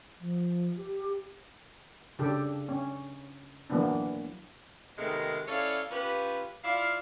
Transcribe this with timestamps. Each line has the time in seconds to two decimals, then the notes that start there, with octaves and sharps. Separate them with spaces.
0.20 F3
0.77 G4
2.19 C#3 D4 G4 A4
2.69 C#4
3.70 E3 F#3 A#3 B3 D4
4.98 C3 D#3 G#3 A3 B3 A#4
5.48 C#4 E4 A4 C#5 D5 F5
5.91 C#4 F4 G4 B4
6.64 E4 F4 D5 F5